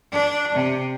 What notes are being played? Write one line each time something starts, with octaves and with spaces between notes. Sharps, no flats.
D4
C3